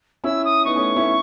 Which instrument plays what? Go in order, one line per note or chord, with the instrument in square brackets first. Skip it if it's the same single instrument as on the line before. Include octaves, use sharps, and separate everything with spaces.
[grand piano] C#4 E4 [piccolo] E6
[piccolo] D#6
[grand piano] B3 D#4 [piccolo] C#6
[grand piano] A3 C#4
C#4 E4